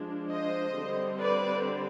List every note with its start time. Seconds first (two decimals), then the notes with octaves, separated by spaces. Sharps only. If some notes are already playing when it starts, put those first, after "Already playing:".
Already playing: F3 G#3 D4
0.29 C5 D#5
0.75 D3 G3 C4
1.19 B4 D5